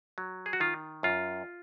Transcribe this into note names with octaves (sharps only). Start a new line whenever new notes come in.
F#3
G#4
F#4
D#3 F4
F#2 F4